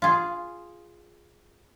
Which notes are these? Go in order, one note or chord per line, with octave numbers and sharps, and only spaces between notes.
F4 G#4